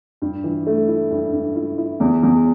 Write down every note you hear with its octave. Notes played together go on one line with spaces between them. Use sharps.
G2
E3
A3
E4
G2
G2
E4
E4
E2
E2